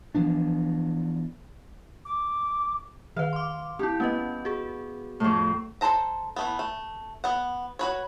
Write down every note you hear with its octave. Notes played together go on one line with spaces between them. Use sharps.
E3 F3 B3 D4
D6
D#3 B4 F5
C6 D6
C4 E4 G4
B3 C#4 B4 D#5
F#4 G#4
F2 A2
A4 A#4 C5 A5 A#5
E3 A3 B3
A3
B3 F#5
F#4 B4 C#5